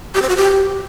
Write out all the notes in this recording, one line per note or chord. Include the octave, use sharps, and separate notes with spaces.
G4
C5
F#4
G4